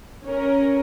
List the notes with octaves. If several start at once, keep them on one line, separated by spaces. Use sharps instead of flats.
C#4 A#4